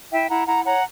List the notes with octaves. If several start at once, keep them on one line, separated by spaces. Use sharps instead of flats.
E4 E5 G5
E4 F#5 A#5
E4 F#5 A#5
C#5 F#5 A#5